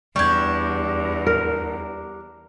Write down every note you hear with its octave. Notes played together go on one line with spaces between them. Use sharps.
E2 G3 D4 C#6 G6 G#6
A#4